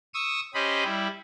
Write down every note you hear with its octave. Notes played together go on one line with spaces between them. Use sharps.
C#6 D#6 E6
C#4 G4 C5 D#5 B5
G3 E4